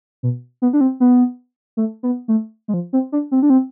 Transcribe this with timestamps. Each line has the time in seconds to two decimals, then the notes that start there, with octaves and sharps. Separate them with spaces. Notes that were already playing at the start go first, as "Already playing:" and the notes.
0.23 B2
0.62 B3
0.73 D4
0.81 C4
1.00 B3
1.77 A3
2.03 B3
2.28 A3
2.68 G#3
2.74 F3
2.93 C4
3.12 D4
3.31 C4
3.42 D4
3.50 C4